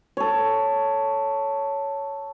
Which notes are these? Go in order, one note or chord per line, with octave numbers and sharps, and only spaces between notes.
A4 C#5